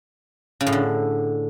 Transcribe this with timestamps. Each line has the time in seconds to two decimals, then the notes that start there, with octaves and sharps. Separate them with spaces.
0.61 C#3
0.67 A2
0.73 D3